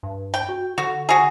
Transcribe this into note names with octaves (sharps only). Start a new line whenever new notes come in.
G2
G5
F#4
D3 F#4
F#4 G#4